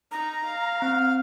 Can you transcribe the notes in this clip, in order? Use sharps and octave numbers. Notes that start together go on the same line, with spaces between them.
D#4 A#5
F5
C4 F6